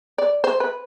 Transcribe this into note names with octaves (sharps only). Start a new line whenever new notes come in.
D5
C5
B4